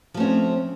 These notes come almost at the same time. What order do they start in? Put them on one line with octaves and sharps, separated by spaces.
F3 A3 C#4 C4